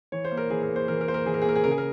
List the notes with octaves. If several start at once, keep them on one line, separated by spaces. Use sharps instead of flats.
E3 C#5
C5
A#3
A#4
E3 G#4
A#4
A#3
C5
E3 A#4
A#4
A#3 C5
A#4
E3 G#4
A#4
G#4
A#3 A#4
G#4
C#3 A#4
G#4
A#4